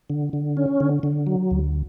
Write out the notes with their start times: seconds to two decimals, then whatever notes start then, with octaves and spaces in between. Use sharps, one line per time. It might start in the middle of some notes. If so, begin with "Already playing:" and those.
0.10 D3
0.33 D3
0.57 C#4
0.80 D3
1.03 D3
1.27 F#3
1.51 D2